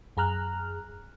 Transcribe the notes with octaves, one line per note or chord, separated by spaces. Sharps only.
F#2 G#4 A#5 F6 F#6